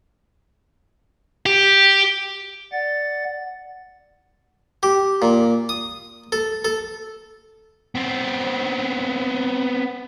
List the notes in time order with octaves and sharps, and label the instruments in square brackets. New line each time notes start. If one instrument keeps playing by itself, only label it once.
[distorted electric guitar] G4
[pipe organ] D5 F#5 A6
[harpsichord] G4
A#2
D#6
A4
A4
[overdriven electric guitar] B3 C4